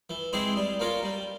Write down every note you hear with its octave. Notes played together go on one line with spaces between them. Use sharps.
E3
G#3 C4 E4 G#4
G3
A#3 C#4 F4 A#4
G3